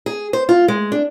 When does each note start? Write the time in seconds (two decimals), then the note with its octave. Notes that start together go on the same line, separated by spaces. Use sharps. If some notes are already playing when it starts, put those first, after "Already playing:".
0.06 G#4
0.33 C5
0.49 F4
0.68 G#3
0.92 D4